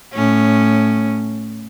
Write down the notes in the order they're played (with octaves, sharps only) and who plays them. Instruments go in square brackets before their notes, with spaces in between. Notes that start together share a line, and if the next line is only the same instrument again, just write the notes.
[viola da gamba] A2 C#4